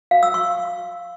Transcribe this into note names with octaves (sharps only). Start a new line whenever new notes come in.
F5
E6
C#6